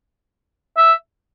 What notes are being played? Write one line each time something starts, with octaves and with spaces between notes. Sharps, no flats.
E5